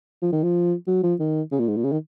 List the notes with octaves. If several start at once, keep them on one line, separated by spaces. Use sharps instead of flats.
F3
D#3
F3
F#3
F3
D#3
C#3
A#2
G#2
A#2
C#3
D#3